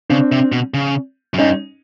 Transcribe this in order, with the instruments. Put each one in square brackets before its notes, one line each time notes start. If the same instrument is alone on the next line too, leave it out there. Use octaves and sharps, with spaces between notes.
[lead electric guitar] C#3 [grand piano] C4 D4
[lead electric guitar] C3
B2
C#3
F#2
[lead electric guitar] G2 [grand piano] C#4 D#4